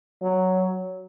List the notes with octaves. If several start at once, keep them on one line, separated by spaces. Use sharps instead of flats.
F#3